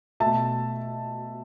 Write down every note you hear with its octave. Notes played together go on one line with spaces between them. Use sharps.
B2 A3 E5 A5